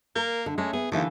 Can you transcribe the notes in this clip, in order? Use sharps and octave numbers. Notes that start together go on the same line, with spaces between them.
A#3 A#4
D3
G#3 A3 C#4
B3 G#4
D#2 D3 E3 F5